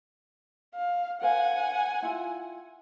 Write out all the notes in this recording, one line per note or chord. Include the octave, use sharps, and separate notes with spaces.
F5
A#4 C5 F5 F#5 G#5
E4 F4 G5